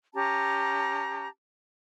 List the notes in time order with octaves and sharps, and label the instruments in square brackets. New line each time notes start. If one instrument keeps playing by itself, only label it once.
[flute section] C#4 G4 A5 A#5